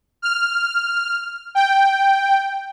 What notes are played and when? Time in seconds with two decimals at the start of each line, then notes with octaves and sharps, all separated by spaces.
0.22 F6
1.55 G5